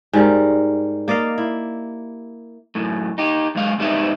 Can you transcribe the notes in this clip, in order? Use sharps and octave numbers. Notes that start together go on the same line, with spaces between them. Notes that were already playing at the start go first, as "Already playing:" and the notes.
G#2 G3 A#4
A#3 D5 D#5 F5
E4
F#2 A2
D#4 G4
F#2 G#3 F5
F2 G#2 G3 B3 D#4 E5